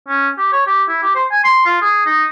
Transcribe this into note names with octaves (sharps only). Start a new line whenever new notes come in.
C#4
G4
C#5
G4
E4
G4
C5
G#5
C6
F4
G#4
D#4